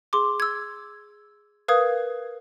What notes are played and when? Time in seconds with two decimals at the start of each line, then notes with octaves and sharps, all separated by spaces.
0.13 G#4 C6 D6
0.40 E6 G#6
1.68 A#4 B4 F5 D#6 G#6